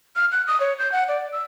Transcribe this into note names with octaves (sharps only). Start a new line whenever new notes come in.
F6
F#6
D#6
C#5
G6
F#5
D5
E6